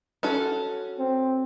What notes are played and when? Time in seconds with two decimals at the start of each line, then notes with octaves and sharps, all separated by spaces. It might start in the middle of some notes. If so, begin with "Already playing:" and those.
0.23 C#4 F#4 A4
0.98 C4